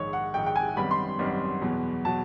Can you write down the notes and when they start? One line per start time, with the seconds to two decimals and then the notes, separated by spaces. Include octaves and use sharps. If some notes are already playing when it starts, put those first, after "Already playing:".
Already playing: A#1 G#2 D#3 C#5
0.13 F#5
0.34 A#1 G#2 D#3 G5
0.46 G5
0.56 G#5
0.77 G#1 F#2 D#3 G3 B3 B5
0.91 C6
1.19 G#1 F#2 D#3 G3 B3
1.61 E2 B2 F#3
2.05 B2 F#3 A5